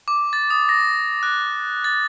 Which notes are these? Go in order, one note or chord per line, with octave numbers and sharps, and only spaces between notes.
D6
A6
D#6
A#6
F#6
A6